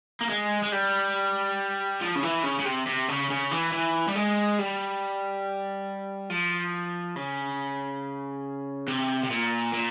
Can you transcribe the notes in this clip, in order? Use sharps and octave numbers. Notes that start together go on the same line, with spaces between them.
A#3
G#3
G#3
G3
F3
C#3
E3
C#3
C#3
C3
C3
C#3
C#3
E3
E3
G3
G#3
G3
F3
C#3
C3
C3
A#2
A#2